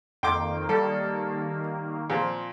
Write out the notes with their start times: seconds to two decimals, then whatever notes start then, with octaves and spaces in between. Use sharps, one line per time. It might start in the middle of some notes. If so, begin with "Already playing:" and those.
0.23 F2 D#3 A#3 G5 C6 D6
0.69 G3 A4
2.10 A#2 F3 C4